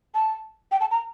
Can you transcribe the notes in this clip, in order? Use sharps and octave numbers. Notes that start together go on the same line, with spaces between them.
A5
G5
A5
A#5